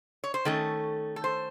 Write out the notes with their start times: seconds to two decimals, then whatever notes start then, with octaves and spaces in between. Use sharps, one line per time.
0.24 C#5
0.34 C5
0.45 D#3 A3 C#4 A4
1.16 A4
1.24 C5